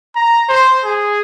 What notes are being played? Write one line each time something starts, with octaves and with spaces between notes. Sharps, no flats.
A#5
C5
G#4